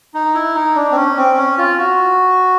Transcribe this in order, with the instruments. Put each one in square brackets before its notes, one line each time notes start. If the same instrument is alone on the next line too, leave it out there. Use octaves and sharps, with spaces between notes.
[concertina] D#4
E4
D#4
D4
C4
C#4
C4
C#4
F4
F#4